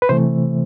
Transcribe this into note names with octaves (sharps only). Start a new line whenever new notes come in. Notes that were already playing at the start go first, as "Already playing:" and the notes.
B4
C3 E3 A3 C5